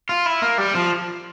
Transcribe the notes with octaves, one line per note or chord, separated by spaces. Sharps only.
F4
E4
A#3
G3
F3